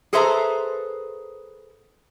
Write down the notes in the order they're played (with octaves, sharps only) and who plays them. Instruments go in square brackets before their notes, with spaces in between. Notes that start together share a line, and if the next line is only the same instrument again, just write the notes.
[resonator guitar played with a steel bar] G#4 A4 B4 C5 E5 A#5